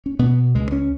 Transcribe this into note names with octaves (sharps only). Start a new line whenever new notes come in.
C#4
B2 B3
C#2 G#3
C#4